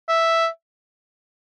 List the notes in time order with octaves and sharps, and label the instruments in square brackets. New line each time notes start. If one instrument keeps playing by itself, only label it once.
[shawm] E5